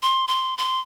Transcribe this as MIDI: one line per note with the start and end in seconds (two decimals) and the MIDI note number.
0.02 0.26 84
0.28 0.56 84
0.58 0.80 84